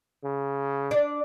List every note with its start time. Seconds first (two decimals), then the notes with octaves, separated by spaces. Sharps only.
0.24 C#3
0.91 D4 D5